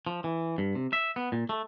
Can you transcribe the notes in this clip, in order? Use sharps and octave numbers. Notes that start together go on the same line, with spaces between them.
F3
E3
G2
C3
E5
B3
A#2
A3